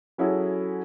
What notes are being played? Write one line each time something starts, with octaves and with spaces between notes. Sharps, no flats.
F#3 C#4 E4 F#4 G#4 A4